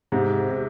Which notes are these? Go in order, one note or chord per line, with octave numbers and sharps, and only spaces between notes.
G#2 C3
C3